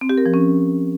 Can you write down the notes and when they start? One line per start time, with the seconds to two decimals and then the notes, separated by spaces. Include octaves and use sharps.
0.01 C4
0.09 G4
0.18 A#4
0.26 F3
0.34 C#4